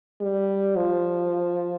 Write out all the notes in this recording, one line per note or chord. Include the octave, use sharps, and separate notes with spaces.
G3
F3